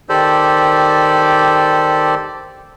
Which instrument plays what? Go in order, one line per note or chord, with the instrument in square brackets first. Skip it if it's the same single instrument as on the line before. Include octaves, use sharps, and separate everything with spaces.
[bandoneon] D#3 G4 A4 C5 D5